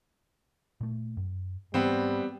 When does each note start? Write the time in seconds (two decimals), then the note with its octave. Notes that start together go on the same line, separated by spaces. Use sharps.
0.81 A#2 A3
1.17 F#2
1.74 G#2 E3 G3 B3 C4